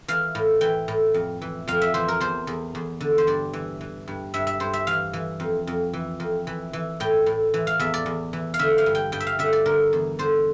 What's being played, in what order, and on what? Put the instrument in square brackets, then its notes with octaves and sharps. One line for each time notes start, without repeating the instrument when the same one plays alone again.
[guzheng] E3 F5
A2
E3 G5
A2
F2
E3
F2 F5
E5
E3 C5
A#4
E2 C5
E2
E2
D3
C5
G2 D5
E3
E3
G2
G2 E5
E5
G2 C5
E5
E3 F5
E3
F2
F2
E3
F2
E3
E3
A2 G5
A2
E3
F5
E2 E5
D5
E2
E3
F5
D3 E5
F5
G2
G5
G2 G5
E5
F5
D3 E5
D5
D3 A#4
E2
D3 C5